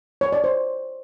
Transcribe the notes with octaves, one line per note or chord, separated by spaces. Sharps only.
C#5
D5
C5